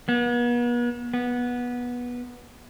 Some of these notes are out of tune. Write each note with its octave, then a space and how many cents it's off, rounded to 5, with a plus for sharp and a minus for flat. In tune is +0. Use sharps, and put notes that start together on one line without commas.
B3 -40
B3 -15